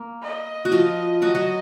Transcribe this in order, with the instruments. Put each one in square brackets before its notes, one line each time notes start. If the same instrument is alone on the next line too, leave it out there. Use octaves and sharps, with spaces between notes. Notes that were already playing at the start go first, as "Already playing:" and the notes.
Already playing: [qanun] A#3
[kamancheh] D#5
[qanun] F#4
F3 F4
[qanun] F#3 F#4 [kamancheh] D#5
[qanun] F#3 F#4